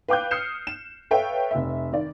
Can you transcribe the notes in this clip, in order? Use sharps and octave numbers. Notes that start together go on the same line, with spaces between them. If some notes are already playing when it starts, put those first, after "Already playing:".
B4 F5 G5 D6 F#6 G6
D#6 F6 G6 C7 C#7 E7
E7
A4 B4 C#5 E5 F5 G5
F1 E5
D#3 D5